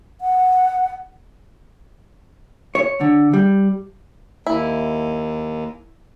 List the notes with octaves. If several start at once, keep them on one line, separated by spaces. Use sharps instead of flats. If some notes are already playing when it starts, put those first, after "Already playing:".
F#5
C#5
D3
G3
D#2 E4